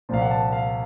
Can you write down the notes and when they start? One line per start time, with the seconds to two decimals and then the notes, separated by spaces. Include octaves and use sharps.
0.09 C2 A#2 F3 F5
0.22 F#5
0.31 A5
0.53 F5